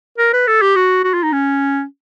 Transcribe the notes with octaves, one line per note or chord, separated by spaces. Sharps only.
A#4
B4
A4
G4
F#4
F#4
F4
D#4
C#4